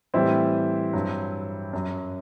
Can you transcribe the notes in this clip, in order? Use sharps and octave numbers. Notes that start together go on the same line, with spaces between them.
A2 E3 G3 C4 E4
G2 F#3
F#2 F#3